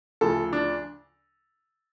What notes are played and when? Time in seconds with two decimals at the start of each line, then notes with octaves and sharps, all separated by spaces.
0.21 D2 C#3 F3 A4
0.53 D4